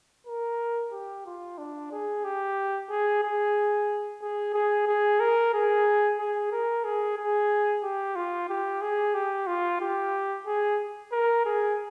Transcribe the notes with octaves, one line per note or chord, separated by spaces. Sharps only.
A#4
G4
F4
D4
G#4
G4
G#4
G#4
G#4
G#4
G#4
A#4
G#4
G#4
A#4
G#4
G#4
G4
F4
G4
G#4
G4
F4
G4
G#4
A#4
G#4